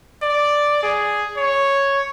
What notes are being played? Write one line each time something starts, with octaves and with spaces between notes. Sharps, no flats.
D5
G#4
C#5